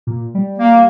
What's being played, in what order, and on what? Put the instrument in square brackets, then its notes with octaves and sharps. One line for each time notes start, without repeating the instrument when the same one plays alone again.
[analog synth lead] A#2
G3
[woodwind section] A#3